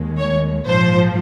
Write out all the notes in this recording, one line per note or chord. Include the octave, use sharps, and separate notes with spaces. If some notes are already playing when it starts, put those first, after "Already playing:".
Already playing: D#2 D#3 G#3
C#5
A#1 G#2 F3 C5